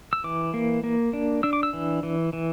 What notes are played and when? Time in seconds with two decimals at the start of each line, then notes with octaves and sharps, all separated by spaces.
0.13 E6
0.24 E3 D6
0.54 A#3
0.84 A#3
1.13 D4
1.43 D4 E6
1.53 D6
1.63 E6
1.73 E3
2.03 E3
2.33 E3